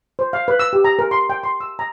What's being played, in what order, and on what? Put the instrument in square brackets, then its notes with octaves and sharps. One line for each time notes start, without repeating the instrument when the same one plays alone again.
[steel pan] C5
F5
B4
E6
G4
A#5
A#4
C6
G5
C6
E6
A#5